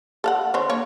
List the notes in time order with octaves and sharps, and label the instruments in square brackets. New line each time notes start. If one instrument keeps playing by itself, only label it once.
[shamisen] A4 F5 F#5
D3 C5 C#5
A#3 C#5